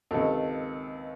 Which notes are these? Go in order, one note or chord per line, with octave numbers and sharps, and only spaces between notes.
C#2 C3 D#3 A4